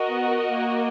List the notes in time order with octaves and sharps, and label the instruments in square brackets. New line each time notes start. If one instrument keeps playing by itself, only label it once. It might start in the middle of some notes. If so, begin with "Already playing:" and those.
Already playing: [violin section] F#4 A#4 D#5
[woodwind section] B3
A#3